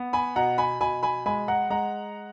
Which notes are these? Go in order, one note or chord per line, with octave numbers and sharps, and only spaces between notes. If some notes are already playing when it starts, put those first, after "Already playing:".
Already playing: B3
G#5 B5
B2 F#5 A#5
G#5 B5
B2 G#5 B5
G#5 B5
G#3 G#5 B5
F#5 A#5
G#3 F#5 A#5